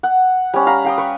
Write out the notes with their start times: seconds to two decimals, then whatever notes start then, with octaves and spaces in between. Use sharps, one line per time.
0.03 F#5
0.54 G3 C#4
0.66 F5 A#5 B5
0.85 F5 G5 D#6
0.98 B4 C#6